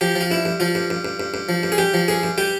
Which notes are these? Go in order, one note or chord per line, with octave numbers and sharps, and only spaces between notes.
F3 G4
F3
F4
G2 E4
G2
F3 F4
G2
G2
G2
G2
G2
F3
G2
G#4
G2 G4
F3
G2 G#4
G2
G3 G4